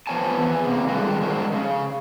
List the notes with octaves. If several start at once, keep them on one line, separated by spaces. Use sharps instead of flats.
F3 B3 C#5 G#5 A5
E3 B3
C3 A#3
D3 D#3 G3 G#3 F#4
F3 G#3 F#4 A#4
C#3